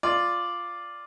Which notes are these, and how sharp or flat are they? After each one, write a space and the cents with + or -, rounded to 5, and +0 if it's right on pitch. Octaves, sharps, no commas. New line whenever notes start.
F4 +0 D5 +0